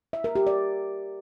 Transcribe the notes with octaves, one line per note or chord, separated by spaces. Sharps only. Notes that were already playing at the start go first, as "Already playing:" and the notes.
E5
A#4
G4
D5